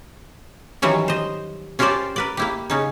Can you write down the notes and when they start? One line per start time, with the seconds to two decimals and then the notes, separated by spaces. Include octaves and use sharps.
0.82 D#3 E3 F#3 G3 C#4
1.08 C5 D#5
1.79 C#4 F4 G4 A#4 C5 D5
2.16 A#4 B4 D5
2.37 A#3 E4 G4
2.70 C#3 C#4 D#4